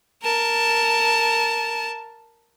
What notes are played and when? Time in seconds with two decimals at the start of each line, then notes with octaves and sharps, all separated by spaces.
0.22 A#4 A5